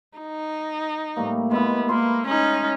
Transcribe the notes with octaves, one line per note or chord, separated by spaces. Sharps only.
D#4
A2 G3 A#3
G#3 B3 E4
A#3 E5 B5 C6
C#4 D#4